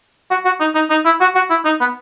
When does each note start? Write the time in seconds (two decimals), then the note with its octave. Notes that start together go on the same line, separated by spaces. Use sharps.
0.31 F#4
0.45 F#4
0.60 D#4
0.75 D#4
0.90 D#4
1.05 E4
1.21 F#4
1.35 F#4
1.50 E4
1.65 D#4
1.80 B3